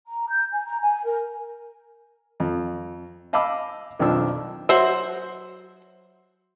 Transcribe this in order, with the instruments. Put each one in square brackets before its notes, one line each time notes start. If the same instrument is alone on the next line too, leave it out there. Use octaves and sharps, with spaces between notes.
[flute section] A#5
G6
G#5
A#5
G#5
A#4
[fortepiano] F2
D#5 F5 A5 B5 D6 E6
B1 F2 D#3 F3 D4 E6
[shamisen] F#3 C5 E5